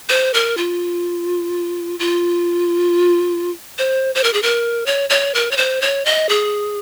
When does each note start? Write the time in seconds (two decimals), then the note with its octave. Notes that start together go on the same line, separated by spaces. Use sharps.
0.09 C5
0.34 A#4
0.57 F4
2.00 F4
3.78 C5
4.15 C5
4.24 A#4
4.33 G#4
4.43 A#4
4.86 C#5
5.10 C#5
5.35 A#4
5.51 C#5
5.57 C5
5.82 C#5
6.05 D#5
6.29 G#4